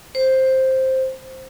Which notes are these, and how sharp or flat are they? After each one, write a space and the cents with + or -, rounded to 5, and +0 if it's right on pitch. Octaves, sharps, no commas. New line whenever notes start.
C5 +5